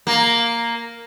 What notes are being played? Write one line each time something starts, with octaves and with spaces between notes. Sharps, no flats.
A#3